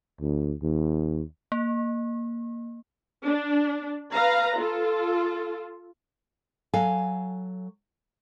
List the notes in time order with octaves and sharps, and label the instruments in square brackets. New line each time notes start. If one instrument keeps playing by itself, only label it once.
[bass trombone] D2
D#2
[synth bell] A#3
[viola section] D4
B4 F5 A#5
F4 A4
[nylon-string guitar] F#3 A4 F5 G#5